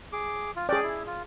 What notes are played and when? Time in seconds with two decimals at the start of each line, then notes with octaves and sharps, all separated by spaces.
0.13 G#4 D6
0.56 F4
0.69 C#4 G#4 D5 G5
0.83 E4
1.06 F4